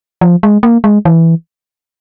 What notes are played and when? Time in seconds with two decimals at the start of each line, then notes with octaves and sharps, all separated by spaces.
0.21 F3
0.43 G#3
0.63 A#3
0.84 G#3
1.05 E3